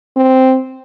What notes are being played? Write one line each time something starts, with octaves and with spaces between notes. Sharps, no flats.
C4